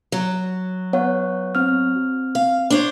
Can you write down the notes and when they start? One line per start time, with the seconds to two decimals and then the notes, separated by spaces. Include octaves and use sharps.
0.12 F#3
0.93 B3 C#5 F#5
1.55 C4 F6
2.35 F5
2.70 D4 C5 C#5